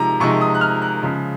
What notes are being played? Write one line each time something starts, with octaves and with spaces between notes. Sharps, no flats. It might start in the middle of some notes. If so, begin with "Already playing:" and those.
Already playing: C3 F3 G#3 D#4 A#5
C3 F3 G#3 D#4 C#6
D#6
F#6
F6
F#6
C#3 F3 G#3